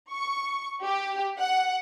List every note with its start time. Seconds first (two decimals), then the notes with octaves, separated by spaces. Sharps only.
0.11 C#6
0.84 G4
1.40 F#5